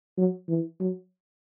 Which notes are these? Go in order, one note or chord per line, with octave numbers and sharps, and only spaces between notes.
F#3
E3
F#3